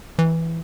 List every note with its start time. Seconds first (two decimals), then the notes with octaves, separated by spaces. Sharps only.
0.19 E3